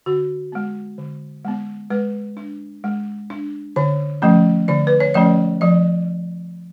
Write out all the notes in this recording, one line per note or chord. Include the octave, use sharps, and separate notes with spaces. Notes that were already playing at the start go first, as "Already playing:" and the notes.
D3 F#4
G#3 B3
D3
G#3 B3
G#3 B4
D4
G#3
D4
D3 C#5
F3 A3 C#4
D3 D5
B4
C#5
F3 A3 C#4 D5
F3 D5